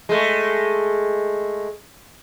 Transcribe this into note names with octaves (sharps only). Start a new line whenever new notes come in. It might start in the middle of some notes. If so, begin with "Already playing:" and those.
G#3 A3